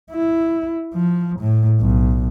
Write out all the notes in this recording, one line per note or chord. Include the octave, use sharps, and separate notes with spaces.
E4
F3
A2
B1